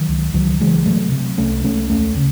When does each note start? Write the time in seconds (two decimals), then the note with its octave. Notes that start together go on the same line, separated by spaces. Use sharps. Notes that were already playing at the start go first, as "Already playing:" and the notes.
Already playing: D#3 F#3
0.08 C#2
0.34 C#2 D#3 F#3
0.60 C#3 E3 G#3
0.86 C3 F#3 A3
1.12 C3
1.38 C2 A3 C#4
1.64 C2 A3 C#4
1.90 D#2 A3 C#4
2.16 C#3